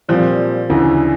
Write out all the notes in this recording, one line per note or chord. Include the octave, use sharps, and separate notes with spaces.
A#2 F3 G3 C4
D2 C#3 E3